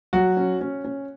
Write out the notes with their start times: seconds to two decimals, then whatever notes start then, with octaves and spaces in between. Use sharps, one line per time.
0.13 F#3 F#4
0.37 C#4
0.61 C#4
0.84 C#4